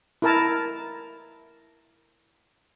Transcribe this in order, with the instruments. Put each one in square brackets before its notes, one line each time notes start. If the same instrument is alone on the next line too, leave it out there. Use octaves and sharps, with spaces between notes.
[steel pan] E4 A#4 A5